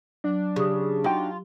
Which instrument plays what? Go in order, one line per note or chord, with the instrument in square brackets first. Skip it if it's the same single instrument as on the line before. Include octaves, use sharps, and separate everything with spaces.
[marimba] F#3 [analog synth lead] D4
[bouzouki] C#3 [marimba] G4 D#6
[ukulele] D#4 F#4 G5 [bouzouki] F4